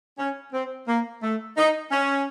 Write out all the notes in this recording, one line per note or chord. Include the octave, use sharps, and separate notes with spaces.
C#4
C4
A#3
A3
D#4
C#4